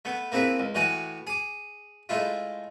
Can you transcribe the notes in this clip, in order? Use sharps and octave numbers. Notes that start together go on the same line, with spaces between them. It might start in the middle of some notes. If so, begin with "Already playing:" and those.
A3 B3
A#3 C4 E4 G#4 B4 E5
C#2
A2 E3 F#4 G5 G#5
G#4 D6
G#3 A3 E4 F4